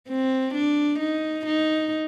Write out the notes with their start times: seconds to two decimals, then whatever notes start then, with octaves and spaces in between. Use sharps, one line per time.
0.09 C4
0.54 D4
0.99 D#4
1.46 D#4